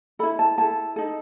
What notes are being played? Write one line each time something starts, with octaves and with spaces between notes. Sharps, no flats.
E4 A4 B5
A5
E4 A4 A5
D#4 A4